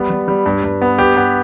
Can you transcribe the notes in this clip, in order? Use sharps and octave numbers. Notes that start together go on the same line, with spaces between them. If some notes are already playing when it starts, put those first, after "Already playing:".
Already playing: G3 B3
G3
G3
G2
G2
B3
G4
B3